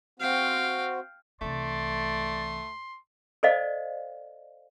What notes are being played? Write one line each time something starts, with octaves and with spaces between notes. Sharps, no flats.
C4 F#4 F5 G5
C2 E3 A3 D5 C6
A4 C5 D5 D#5 F5